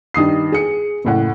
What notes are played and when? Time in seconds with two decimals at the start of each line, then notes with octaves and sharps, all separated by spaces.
0.14 G2 D#3 D#6 C7
0.52 G#4 C#7
1.05 F#1 A2 F#5